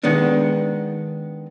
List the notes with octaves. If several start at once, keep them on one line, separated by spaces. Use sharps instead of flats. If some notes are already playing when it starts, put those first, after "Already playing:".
D#3 G#3 B3 D4